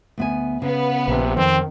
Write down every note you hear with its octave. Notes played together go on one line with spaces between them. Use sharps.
D2 B3 G#5
C#3 B3 B4
A#1 C3
F2 D#3 C4